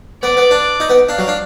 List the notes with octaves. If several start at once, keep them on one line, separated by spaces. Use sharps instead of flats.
B3 D5
B3
D4
D#4
B3
D4 F5
F#3
D4